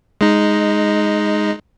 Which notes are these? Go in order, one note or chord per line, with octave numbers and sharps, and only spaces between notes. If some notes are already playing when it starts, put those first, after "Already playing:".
G#3 D#4